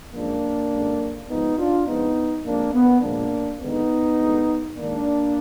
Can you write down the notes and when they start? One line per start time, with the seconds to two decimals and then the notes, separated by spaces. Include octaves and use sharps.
0.13 F#2 F3 G#3 A#3 D4
0.71 F#2 D3 G#3
1.29 G#2 F3 G#3 B3 D#4
1.58 D4 F4
1.87 F2 F3 G#3 B3 D#4
2.45 F2 F3 G#3 A#3 D4
2.73 B3
3.02 A#2 F3 G#3 A#3 D4
3.60 D#2 D3 G#3 B3 D#4
4.18 D2 D3 G#3
4.76 D#2 D#3 G#3 A#3 D4